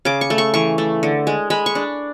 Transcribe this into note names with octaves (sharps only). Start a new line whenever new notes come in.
C#3 D6
C#6
A3
C#6
E3 C#6
A3
D3
G#3
G#3 B5
C#6
D4